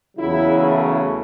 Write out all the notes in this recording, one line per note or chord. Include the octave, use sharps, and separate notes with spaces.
E2 C#3 F#3 E4
A3